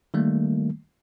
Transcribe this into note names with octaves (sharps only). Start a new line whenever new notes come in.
D#3 G3 A3 A#3